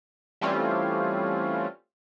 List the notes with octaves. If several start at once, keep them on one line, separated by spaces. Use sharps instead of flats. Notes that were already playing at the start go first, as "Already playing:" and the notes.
E3 G3 A3 C4 C#4 F4